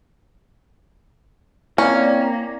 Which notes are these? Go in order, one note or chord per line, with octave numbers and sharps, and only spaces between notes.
A#3 C4 C#4 E4 D5